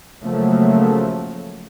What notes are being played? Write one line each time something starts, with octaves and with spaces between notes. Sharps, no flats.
C#3 F3 F#3 A3 A#3